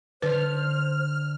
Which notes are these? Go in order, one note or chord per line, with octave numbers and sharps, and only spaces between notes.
D3 B4 C5 F6